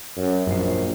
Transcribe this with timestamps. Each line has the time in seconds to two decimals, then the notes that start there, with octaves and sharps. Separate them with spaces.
0.17 F#2
0.47 A#1 F#2 C7